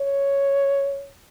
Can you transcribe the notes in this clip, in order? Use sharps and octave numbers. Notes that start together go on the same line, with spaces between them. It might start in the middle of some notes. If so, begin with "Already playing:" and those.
Already playing: C#5